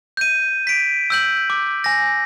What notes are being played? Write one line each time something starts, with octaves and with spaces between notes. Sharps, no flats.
G6 D#7
B6 D7
E6 G6 F#7
D6
G#5 A#6